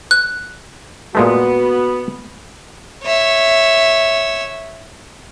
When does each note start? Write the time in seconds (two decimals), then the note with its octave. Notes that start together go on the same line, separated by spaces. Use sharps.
0.11 F#6
1.15 A#2 G#3 A3 B3 F#4
3.04 C#5 E5